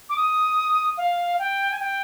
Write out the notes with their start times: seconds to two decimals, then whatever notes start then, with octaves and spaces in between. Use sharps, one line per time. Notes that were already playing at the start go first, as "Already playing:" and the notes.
0.09 D6
0.16 D#6
0.97 F5
1.39 G5
1.71 G#5
1.79 G5